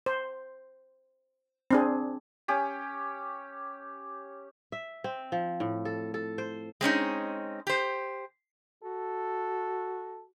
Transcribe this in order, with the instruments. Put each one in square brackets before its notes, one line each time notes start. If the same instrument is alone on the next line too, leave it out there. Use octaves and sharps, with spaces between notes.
[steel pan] C5
C4 D4 G#4
[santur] C#4 G4
[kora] E5
C4
F3
A2
A4
A4
C5
[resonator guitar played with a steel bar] G#3 C4 C#4 D#4
G4 C5
[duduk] F#4 [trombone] A4